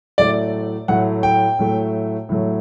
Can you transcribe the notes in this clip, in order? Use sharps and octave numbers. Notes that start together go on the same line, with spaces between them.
A2 F#3 A3 D5
A2 F#3 A3 F#5
G5
A2 F#3 A3
A2 F#3 A3